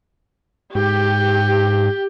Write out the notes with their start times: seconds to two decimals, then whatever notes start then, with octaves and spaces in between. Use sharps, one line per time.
0.75 G#2 G4